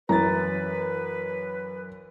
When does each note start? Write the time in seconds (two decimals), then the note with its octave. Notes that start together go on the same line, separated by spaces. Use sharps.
0.09 F#2 E3 B4 A#5 A6